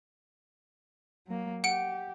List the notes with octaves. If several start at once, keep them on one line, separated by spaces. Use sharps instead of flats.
F#3 A#3
G4 F#5 D7